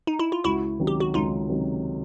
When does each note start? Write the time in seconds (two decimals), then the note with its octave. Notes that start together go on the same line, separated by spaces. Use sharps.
0.07 D#4
0.19 E4
0.32 F4
0.44 C#2 E4 F#4
0.79 C3 D#3 F#3
0.87 G4
1.00 F#4
1.14 C#2 D#4 F4
1.49 C3 D#3 F#3